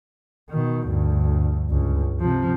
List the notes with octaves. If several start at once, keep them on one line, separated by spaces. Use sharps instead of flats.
B2 D#3
D2 G2
C#2 G2
C3 F3